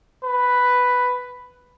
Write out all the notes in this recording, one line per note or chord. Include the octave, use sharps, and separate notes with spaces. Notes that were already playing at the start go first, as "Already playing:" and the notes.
B4